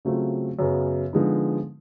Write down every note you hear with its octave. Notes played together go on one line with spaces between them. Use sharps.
C#3 F#3 A3 C4 F4
F#2 C#3 F#3 B3
D3 F3 G#3 B3 D#4